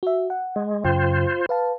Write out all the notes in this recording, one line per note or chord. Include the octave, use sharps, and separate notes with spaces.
F#4 E5
F#5
G#3
F#2 C#3 F4 C5 G5
B4 F5 A5